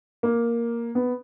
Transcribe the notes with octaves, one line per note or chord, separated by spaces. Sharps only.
A#3
B3